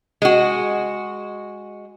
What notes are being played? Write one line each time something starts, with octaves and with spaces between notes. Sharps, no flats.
G#3 F#4